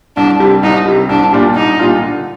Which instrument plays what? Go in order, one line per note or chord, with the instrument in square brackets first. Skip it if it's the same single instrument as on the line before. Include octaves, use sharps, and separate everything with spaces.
[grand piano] C2 [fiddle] D4
[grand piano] C3 G3
[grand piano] C2 [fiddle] D#4
[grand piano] C3 G3
[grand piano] C2 [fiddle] D4
[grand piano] A#2 G3 D4 F4
[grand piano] C2 [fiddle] D#4
[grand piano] A#2 G3 D4 F4
D3